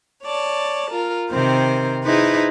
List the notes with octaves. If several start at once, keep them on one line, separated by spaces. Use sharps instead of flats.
C#5 D5 A5
F4 A#4
C3 D#3 C4 A#4 C5
D#4 E4 G#4 B4 C5